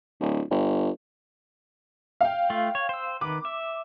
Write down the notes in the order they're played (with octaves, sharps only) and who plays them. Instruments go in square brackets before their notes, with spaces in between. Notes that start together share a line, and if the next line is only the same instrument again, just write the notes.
[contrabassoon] D1
G1
[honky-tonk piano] F5 G5
[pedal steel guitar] A3 F4
C#5
C5 E6
[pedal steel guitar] D#3 B4 [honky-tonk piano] D6
[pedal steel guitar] E5